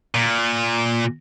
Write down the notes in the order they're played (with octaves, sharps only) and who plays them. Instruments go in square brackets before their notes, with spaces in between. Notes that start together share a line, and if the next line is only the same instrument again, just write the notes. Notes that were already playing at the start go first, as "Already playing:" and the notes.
[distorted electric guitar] A#2